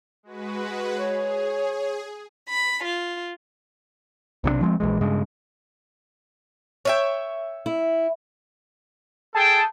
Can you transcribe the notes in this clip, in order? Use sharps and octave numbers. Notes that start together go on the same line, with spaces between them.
G#3 F#4 B4
G#4 C#5
B5
F4
B1 C3 F3 D4
F3 G#3 B3 C4
A#1 E3 G#3
G2 C#3 G#3
C#5 E5 G5
E4
G#4 A4 G5 A5